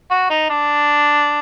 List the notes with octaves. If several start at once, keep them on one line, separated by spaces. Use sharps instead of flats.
F#4
D#4
D4